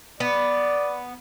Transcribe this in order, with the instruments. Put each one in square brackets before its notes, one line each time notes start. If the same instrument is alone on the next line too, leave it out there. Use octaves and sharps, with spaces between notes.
[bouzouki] B3 [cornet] D5